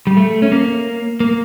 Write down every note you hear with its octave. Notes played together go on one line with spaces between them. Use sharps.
G3
A3
C#4
A#3
A#3